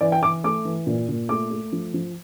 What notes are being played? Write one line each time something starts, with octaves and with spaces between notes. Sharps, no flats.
E3 D5
G5
E3 D6
A3 D6
E3
A#2
A#2
A3 D6
A3
F3
F3